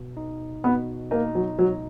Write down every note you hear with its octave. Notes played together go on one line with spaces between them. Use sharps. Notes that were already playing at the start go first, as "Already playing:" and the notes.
Already playing: B2
D#4
B2 B3
A#3 D#4
F#3
C#2 F#3